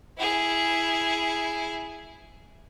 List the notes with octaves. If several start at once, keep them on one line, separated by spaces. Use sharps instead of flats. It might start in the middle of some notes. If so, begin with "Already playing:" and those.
E4 G#4